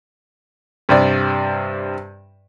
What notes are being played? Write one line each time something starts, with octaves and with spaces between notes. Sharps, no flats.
G2 C3 D5